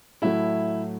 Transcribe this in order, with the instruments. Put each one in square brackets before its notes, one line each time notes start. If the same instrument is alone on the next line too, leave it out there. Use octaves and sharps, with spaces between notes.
[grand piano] A2 F#3 A3 E4 E5